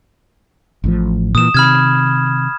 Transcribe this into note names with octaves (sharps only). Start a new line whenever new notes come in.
A1 A2 F3
A#2 E3 D#6 E7
C3 D#3 B5 F6 G#6